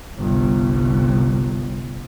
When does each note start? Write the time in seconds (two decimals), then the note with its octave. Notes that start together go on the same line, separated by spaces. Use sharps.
0.18 G1 C2